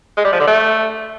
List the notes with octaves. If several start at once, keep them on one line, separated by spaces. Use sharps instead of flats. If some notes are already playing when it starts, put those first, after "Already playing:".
G#3
G3
F3
D3
A3